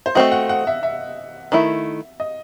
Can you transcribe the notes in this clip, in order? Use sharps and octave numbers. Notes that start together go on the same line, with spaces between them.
C5
A3 C4 F#4 D#5
F#5
F#5
E5
E5
D#3 A3 E4
D#5